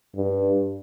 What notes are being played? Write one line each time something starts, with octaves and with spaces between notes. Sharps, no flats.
G2